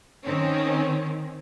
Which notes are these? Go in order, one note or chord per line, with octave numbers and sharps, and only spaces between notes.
D#3 C4 C#4